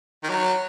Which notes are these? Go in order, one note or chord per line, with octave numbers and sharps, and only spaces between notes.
D#3
F#3